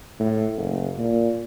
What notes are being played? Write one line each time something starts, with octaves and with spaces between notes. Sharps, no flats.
A2
F#1
A#2